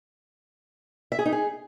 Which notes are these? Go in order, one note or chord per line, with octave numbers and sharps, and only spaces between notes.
E5
G#4
D#4
G#4